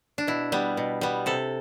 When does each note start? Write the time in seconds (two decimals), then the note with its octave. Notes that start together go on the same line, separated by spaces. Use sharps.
0.18 D4
0.27 B2 E4
0.52 G3 B3
0.77 B2
1.01 G3 B3
1.26 C3 A4